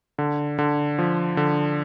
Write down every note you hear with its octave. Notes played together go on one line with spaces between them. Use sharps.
D3
D3
F3
D3